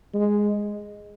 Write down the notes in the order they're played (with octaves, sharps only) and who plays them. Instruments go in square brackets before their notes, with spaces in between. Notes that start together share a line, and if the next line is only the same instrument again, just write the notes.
[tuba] G#3